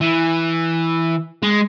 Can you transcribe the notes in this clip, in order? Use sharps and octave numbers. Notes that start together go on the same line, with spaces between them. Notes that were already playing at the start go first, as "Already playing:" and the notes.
E3
G#3